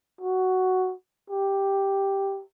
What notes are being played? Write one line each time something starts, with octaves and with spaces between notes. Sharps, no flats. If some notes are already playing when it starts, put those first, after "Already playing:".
F#4
G4